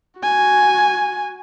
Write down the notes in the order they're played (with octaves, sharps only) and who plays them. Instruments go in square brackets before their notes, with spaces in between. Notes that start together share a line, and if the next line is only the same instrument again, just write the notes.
[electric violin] F#4 G#5